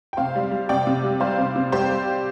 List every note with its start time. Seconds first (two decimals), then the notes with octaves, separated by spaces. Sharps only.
0.13 G5
0.17 C3 C5 F5
0.35 G3
0.51 G3
0.69 C3 D5 G5
0.87 C3
1.03 G3
1.20 G3 C5 F5
1.38 C3
1.56 C3
1.72 G3 G4 C5